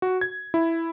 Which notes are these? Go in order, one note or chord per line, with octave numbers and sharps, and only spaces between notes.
F#4
G#6
E4